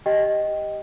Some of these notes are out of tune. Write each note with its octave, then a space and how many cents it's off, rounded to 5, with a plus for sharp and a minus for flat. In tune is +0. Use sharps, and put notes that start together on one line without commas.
G4 +0 D#5 +0 G5 +0